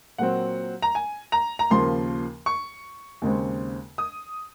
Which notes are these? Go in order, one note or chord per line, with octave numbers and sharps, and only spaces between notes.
A#2 F#3 C4 F#5
A#5
G#5
A#5
A#5
D#2 C#3 F3 A#3 C6
C#6
D#2 C#3 G#3 C4
D#6